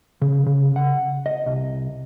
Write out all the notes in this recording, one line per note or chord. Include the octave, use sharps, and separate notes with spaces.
C#3
C#3
F#5
D#5
C2